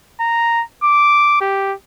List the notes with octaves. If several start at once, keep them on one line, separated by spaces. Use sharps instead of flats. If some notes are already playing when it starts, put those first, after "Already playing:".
A#5
D6
G4